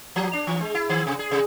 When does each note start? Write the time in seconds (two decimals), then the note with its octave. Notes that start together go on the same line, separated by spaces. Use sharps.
0.16 F3
0.33 D4
0.47 E3
0.61 G#3
0.75 E4
0.89 D#3
1.07 C3
1.19 G#4
1.31 C3